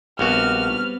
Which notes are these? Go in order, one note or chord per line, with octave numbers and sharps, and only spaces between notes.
A#1 G3 B3 C4 F#4 F6